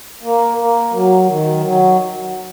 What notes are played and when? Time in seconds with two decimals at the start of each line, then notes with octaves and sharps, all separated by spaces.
0.23 A#3
0.58 A#3
0.93 F#3
1.27 D#3
1.63 F#3